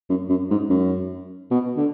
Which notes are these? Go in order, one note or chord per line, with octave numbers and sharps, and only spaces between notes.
F#2
F#2
G#2
F#2
B2
D3